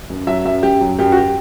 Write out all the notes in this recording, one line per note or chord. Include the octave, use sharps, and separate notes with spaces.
F#2
F#3 E5
F#2 E5
F#2 G4
F#3
F#2 G4
F#4
G4